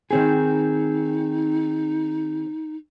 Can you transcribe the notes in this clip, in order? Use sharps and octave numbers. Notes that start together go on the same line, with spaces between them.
D#3 C4 D#4 G#4